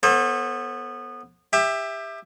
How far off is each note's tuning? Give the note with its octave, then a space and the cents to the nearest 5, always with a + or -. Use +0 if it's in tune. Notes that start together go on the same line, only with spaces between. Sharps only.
B3 -10 A4 +0 C5 +45
G4 +25 E5 +0